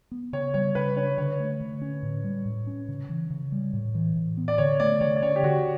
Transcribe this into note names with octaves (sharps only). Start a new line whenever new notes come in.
B3
C#3 C#5
G3 C#5
C#3 B4
D4 C#5
D3 C#5
A3
D3
C#4
A2
G3
A2
C#4
C#3
E3
C#3
G3
A2
E3
A2
B3
D5
D3 C#5
A3 D5
D3 C#5
D5
C#4 C#5
G4
D3 F#4